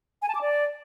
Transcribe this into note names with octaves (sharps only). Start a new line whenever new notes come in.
G#5
A5
D6
D5